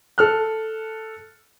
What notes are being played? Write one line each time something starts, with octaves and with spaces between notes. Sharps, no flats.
A4 F6 F#6